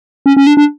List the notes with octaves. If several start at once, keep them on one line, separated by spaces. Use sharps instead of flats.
C#4
C#4
D4
D4